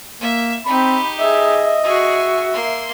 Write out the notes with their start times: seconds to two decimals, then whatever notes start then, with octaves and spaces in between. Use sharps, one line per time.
0.21 A#3 E5
0.66 C4 D#4 G4 B5
1.19 G#4 D#5 E5
1.84 F#4 G#4 E5 C#6
2.52 A#3 C6